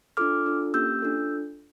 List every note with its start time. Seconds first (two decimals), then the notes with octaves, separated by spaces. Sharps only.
0.17 D4 F4 A4 D6 F6
0.46 D4 F4 A4
0.74 A#3 C#4 G4 E6 G6
1.02 D4 F4 A4